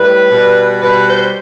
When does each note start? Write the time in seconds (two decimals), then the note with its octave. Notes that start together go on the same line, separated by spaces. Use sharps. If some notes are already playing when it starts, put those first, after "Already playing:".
Already playing: A2 G3 B4
0.30 B2 G3
0.81 B2 G3 B4
1.07 C5